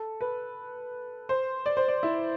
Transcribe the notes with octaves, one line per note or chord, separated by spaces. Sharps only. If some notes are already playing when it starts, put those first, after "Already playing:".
Already playing: A4
B4
C5
D5
C5
D5
E4